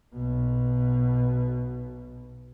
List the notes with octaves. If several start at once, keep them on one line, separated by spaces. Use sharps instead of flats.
B1 B2